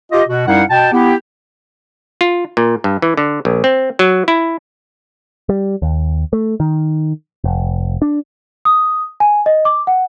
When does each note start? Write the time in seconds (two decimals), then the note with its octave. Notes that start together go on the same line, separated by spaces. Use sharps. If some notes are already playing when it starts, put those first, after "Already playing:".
0.12 F4 G4 D#5
0.29 B2 F#4
0.48 F#2 G3 D#4 E4 F5 F#5
0.70 B2 G5 A5
0.93 B3 E4 G4
2.21 F4
2.57 A#2
2.84 G2
3.02 E3
3.17 D3
3.45 A#1
3.64 C4
3.99 F#3
4.28 E4
5.49 G3
5.82 D#2
6.33 A3
6.60 D#3
7.44 F1
8.02 D4
8.65 D#6
9.20 G#5
9.46 D#5
9.65 D6
9.87 F#5